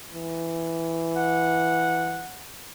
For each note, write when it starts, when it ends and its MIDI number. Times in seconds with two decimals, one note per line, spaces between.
0.13 2.26 52
1.16 2.47 78